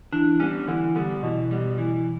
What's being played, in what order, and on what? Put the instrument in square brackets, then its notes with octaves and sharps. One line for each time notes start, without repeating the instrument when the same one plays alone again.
[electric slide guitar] E3 [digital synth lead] D4
[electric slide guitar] G3 B3 [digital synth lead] C#4
[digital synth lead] D3 [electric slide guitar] E3
[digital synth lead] D3 [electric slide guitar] G3 B3
[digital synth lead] B2 [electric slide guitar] E3
[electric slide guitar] G3 B3
E3